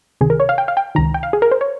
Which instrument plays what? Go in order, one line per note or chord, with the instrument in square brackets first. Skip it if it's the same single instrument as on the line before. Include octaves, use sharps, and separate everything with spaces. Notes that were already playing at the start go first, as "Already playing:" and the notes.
[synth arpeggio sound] C#2 C3 D#3 G#4
A#4
C#5
F5
G5
F5
G5
C#2 C3 D#3 A#5
G5
F5
G#4
A#4
C5
C#5